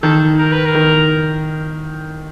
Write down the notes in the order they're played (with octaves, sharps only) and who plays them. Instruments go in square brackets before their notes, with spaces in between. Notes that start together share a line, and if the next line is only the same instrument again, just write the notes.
[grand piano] D#3 [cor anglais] A4
[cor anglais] A#4
B4
A#4
[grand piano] D#3